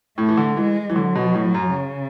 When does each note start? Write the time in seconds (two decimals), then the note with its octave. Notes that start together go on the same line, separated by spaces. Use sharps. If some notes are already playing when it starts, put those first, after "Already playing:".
0.18 A2 A3
0.29 E3
0.37 D3
0.57 E3 G#3
0.89 E3
0.95 D3 F#3
1.15 B2
1.35 A2
1.54 F#2
1.73 C#3